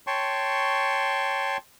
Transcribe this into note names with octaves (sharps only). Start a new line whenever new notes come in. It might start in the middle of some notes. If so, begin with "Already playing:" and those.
C#5 G5 A5 C6 C#6